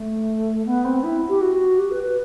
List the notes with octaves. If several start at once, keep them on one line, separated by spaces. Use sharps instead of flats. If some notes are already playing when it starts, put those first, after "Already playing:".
Already playing: A3
B3
C4
E4
G4
F#4
G4
B4
B4